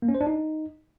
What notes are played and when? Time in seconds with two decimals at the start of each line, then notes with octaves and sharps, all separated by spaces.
0.02 A#3
0.08 C#4
0.15 C5
0.21 D4
0.27 D#4